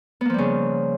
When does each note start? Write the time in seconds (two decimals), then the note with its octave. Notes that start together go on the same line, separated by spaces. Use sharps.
0.21 B3
0.25 A#3
0.30 F3
0.34 G3
0.38 C#3